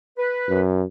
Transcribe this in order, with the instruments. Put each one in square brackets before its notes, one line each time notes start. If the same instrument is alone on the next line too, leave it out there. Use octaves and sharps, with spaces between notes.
[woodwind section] B4
[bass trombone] F#2